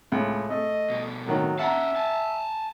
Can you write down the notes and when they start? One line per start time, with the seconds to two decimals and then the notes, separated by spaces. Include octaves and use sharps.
0.12 C#2 A2
0.50 A3 D#5
0.90 B2 G3
1.27 A2 D#3 F#3
1.59 C#4 E5 F#5 A5 A#5
1.96 G#5 A5